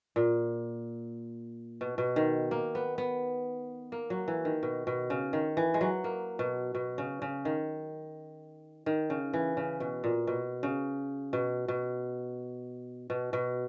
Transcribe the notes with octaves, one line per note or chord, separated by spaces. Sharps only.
A#2
B2
B2
D#3
A#3
B3
B3
A#3
F#3
E3
D#3
B2
B2
C#3
D#3
E3
G#3
F#3
A#3
B2
B2
C#3
C#3
D#3
D#3
C#3
E3
C#3
B2
A#2
B2
C#3
B2
B2
B2
B2